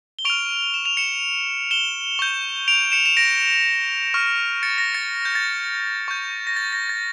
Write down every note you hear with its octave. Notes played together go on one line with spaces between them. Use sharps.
G7
C#6 F6 D7 F7
E7
F7
C#7 E7
E7 G7
C#6 G6
D7 F7
C#7 E7
E7
A#6 D7
C#6 F6
A6 C#7
A#6
A6 C#7
G6
A6
C#6 G6
A#6
A6
A#6
A6